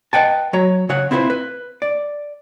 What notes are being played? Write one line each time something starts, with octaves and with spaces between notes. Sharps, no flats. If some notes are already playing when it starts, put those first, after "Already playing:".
B4 D#5 F#5 G5 A5
F#3 C#5 A#5
C#3 C#5 F#5
C4 E4 F4 G#4 B4 C5
B4
D5